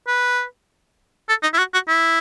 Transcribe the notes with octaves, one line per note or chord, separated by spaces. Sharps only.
B4
A4
D#4
E4
F#4
F#4
E4